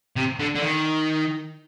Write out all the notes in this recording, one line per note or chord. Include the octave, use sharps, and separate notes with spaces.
C3
D3
D3
D#3